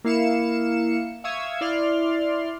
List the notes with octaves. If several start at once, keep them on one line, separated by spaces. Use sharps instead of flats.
A#3 E4 F5 C#7 E7
E5 F5 C#6 D#6 E6 G#6
E4 D5 C6 F6